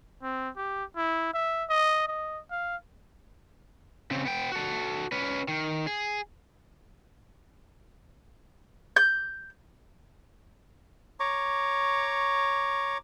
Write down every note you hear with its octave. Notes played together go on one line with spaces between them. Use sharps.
C4
G4
E4
E5
D#5
D#5
F5
C#3 C4
B3 G5
F#4 A4
C#4 B4
D#3
G#4
G6
C#5 A#5 C#6 D6